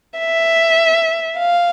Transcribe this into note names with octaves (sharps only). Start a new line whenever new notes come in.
E5
F5